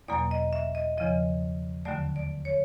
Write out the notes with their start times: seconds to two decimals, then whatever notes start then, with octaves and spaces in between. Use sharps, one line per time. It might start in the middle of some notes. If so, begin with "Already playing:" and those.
0.08 E2 B2 F#3 A#3 D5
0.31 D#5
0.53 E5
0.75 D#5
0.97 E2 C#3 F3 D#5
1.85 D#2 D3 F#3 A3 D5
2.16 D5
2.45 C#5